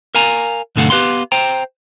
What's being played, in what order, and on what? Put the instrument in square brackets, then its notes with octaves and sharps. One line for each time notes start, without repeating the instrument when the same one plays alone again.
[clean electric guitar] A#4 F5 G#5 A#5
B1 G2 D3 A3 F5 F#5
B3 G4 B4 F5 F#5 C6
C5 G5 A#5